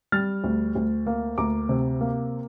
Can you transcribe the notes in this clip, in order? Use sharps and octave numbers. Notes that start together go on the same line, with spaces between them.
G3 F6 A6
D2
D2
A#3
D2 A#5 D6
C3
A#3